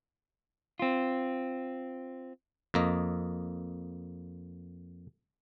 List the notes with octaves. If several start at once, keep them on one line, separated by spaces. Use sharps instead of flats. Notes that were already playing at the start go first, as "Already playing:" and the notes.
C4 F4
F2 A#3 D#5